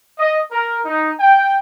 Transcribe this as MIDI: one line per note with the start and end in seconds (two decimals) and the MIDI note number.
0.19 0.40 75
0.52 0.80 70
0.85 1.11 63
1.20 1.57 79